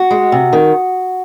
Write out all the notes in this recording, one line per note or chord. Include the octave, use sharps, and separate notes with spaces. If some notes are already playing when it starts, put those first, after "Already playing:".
Already playing: F#4
G#3
C3
D#3